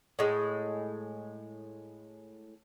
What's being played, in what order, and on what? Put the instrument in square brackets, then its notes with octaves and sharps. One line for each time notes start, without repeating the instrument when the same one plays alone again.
[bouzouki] A2 G#3